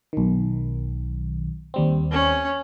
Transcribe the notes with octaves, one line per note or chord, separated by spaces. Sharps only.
B1 D#3
D#2 G3 C4
C#4